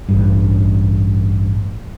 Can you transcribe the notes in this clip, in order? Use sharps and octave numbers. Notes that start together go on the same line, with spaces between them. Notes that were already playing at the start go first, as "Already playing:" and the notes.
A1 G2